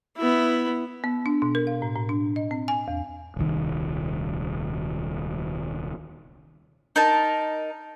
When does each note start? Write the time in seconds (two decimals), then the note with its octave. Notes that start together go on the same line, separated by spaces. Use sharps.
0.17 B3 E4
1.04 B3
1.26 D4
1.42 B2
1.55 A#4
1.67 F5
1.82 A2
1.96 A2
2.09 D4
2.36 D#5
2.51 C4
2.68 G#5
2.88 E2
3.37 D#1 C2 D#3
6.96 D#4 A#4 A5